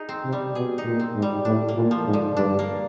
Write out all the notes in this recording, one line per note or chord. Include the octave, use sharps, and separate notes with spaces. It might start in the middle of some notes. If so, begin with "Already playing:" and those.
Already playing: D#4 G#4
C4
C3
G3
B2 G#4
D#4
A#2
C4
G#2
G3
A2 D4
A#3
A#2
F3
G#2
D3
G2 D4
A#3